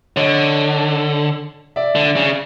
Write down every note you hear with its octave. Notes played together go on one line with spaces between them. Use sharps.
D3 C#5 D#5
D5 E5
D3
C#3